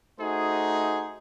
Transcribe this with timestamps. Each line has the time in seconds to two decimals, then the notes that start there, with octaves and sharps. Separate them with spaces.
0.19 A3 D#4 F#4 G#4 C5